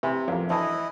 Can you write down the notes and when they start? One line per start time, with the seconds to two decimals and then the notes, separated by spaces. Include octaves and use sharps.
0.03 C3 E3
0.28 A1 F2 A#3
0.50 D2 E3 A3 E4 D#5